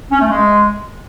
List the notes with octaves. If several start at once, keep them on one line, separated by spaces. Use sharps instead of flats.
C#4
A3
G#3